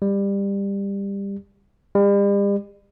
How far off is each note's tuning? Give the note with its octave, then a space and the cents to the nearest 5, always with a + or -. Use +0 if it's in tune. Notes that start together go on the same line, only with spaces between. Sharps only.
G3 +20
G3 +40